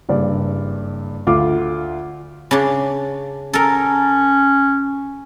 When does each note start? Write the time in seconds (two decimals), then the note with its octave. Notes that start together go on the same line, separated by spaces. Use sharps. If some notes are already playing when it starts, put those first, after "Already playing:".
0.09 F#1 G2 D5
1.27 D2 F4 D6
2.51 C#3 D4
3.53 C#4 A4 A#4